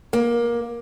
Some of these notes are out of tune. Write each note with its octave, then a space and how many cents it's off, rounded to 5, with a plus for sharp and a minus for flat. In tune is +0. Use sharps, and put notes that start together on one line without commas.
A#3 +20